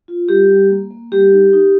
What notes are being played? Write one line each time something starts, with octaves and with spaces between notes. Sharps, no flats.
F4
G3 G4
G3
A#3
A#3
G3 G4
D#4
D#4